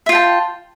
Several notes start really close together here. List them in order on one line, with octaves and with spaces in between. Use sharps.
E5 F4 G5 A5